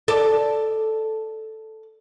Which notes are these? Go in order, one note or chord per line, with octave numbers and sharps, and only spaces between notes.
A4 D5